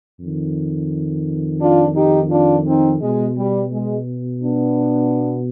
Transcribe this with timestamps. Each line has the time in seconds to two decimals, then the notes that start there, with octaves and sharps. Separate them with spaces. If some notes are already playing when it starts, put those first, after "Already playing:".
0.18 F2 D#3
1.60 D4 F4
1.95 D#4 G4
2.30 D4 F4
2.66 C4 D#4
3.01 B2 G#3
3.37 G3
3.72 G#3
4.43 B3 D4